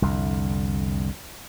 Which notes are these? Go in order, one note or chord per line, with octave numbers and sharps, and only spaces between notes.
C2 F2 D3